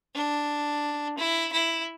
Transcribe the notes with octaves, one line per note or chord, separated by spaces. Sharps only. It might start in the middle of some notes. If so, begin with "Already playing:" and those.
D4
E4
E4